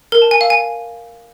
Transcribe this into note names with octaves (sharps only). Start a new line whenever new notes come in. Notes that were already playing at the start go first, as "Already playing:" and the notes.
A#4
A5
G#5
F5
G#5